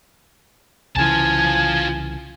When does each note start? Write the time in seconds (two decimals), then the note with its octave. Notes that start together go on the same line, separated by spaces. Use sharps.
0.96 C2 C#3 E3 F4 G#5 A5